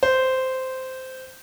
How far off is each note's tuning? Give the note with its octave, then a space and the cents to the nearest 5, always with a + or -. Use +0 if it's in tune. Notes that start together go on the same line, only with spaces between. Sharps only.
C5 -10